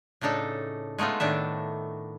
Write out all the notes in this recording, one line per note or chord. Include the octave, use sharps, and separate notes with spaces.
A2 C#3 D4 D#4 A4
G#3 A3 B3 D#4 F4
A2 D#3 D4 E5